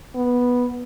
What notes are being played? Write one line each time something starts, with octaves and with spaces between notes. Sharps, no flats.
B3